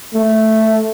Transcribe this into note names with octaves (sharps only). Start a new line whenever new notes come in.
A3